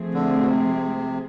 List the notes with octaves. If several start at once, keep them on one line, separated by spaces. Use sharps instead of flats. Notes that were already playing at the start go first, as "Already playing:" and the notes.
Already playing: F3 A3 C4 G#4
D3
B2
C3